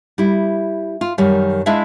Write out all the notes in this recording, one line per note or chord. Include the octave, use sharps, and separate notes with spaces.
G3 E4
F4
F#2 D#3 G3
G#3 D4 E4 E5 F5